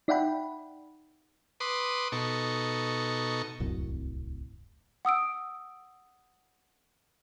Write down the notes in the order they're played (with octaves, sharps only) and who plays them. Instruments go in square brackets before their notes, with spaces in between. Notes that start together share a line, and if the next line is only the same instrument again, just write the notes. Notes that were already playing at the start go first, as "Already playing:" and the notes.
[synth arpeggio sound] D#4 D5 E5 F#5 G5 B5
[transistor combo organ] B4 C6 D6 D#6
B2 D#4 A4 C#6
[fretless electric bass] D1 C2 F#2
[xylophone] F#5 D#6 E6 D7